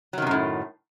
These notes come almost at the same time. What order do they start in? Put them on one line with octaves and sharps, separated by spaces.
F#3 D#3 C3 F#2 A2